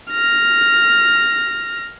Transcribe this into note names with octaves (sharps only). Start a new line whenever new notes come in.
F6 A#6